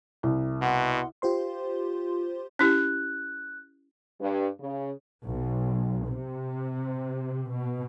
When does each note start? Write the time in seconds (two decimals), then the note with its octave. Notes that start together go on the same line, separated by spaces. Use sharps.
0.23 C2
0.62 B2 F#5 C6
1.22 F4 G4 C5 C6
2.59 C#4 E4 G4 F#6
4.21 G2
4.60 C#3
5.27 B1
6.11 C3
7.51 B2